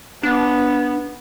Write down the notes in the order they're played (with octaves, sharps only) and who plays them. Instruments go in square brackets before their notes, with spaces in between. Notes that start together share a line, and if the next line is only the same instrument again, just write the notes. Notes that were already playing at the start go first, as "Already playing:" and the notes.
[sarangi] B3 [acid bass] D4